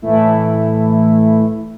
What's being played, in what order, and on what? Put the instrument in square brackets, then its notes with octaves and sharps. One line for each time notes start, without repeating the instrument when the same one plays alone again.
[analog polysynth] A2 E3 A3 E4